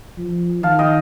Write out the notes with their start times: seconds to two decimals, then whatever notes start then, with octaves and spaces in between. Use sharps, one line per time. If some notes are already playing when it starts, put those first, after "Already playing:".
0.18 F3
0.63 D#3 F5 A5
0.79 D#5 G5